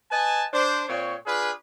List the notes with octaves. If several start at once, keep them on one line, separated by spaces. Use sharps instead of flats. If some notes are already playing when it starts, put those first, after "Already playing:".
B4 D#5 G#5 A5
D4 C5
A#2 C4 C#5
D4 F4 G#4 B4